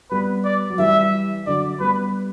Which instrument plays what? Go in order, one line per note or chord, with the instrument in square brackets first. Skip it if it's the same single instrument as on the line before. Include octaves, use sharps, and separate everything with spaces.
[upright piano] G3 B3 [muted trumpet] B4
[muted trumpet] D5
[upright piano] F#3
[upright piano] E3 G3 [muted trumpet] E5
[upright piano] D3 F#3 [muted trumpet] D5
[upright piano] G3 B3 [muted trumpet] B4